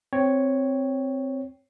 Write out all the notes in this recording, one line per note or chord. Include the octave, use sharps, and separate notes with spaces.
C4 C#5 G5